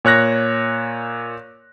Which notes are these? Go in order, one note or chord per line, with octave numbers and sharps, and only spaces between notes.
A#2 C#5 F#6 A#6